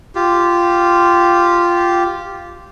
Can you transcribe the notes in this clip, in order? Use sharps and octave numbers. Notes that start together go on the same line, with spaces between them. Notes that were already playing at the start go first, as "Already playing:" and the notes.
F4 G4